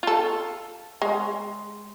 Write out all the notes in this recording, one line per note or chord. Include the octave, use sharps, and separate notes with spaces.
F4 A4
G#3